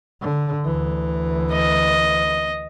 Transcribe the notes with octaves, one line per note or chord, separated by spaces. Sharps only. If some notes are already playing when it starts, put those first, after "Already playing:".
D3
D2 E3
D#5